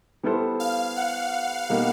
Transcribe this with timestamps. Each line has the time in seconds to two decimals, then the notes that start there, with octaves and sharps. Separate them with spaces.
0.23 G3 B3 E4 A4 C5
0.60 F5
0.96 F#5
1.70 B2 G3 A#3 D#4